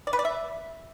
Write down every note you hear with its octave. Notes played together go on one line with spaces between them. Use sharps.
D5
B4
D5
E5